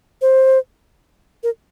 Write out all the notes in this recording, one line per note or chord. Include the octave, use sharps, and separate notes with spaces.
C5
A#4